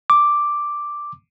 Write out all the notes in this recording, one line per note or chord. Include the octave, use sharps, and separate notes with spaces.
D6